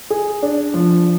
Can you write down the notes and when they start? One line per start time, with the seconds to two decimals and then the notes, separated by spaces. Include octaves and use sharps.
0.10 G#4
0.43 D4
0.74 F3